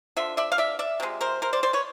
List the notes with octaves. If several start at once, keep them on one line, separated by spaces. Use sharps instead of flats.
D3 F3 E5
D5 E5
F5
D5 E5
D5 E5
C3 F3 G#3
A#4 C5
A#4 C5
C5 D5
C5 D5
B4 C#5